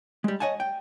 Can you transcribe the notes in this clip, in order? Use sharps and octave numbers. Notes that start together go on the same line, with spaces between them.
G3 G#3
C#5 D#5 F#5 G#5 A5
G5